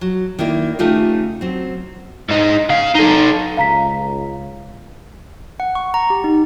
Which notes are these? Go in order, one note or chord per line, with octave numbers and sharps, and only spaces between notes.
F#3
D#3 A#3 E4 D5
C#3 A3 D#4 F4 G4
F#3 C4
G#2 D#4
C#3 F5
D#4 A4
C#2 F5 A#5 B6
F#5
C#6
A#5
G4
D#4